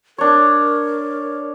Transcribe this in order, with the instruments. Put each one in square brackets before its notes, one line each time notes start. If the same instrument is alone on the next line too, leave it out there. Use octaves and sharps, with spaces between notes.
[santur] D4 C#5 [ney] A#4